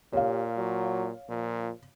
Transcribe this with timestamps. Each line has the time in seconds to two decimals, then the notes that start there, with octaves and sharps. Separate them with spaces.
0.13 A#2 G4 C#5 F5
0.57 F#3
1.29 A#2 F3